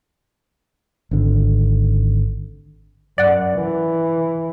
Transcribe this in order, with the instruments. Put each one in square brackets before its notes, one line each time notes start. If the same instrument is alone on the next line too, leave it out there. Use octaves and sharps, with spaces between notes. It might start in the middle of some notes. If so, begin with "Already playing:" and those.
[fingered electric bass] G#1 D3
[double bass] F#2 [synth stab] D5 F#5
[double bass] E3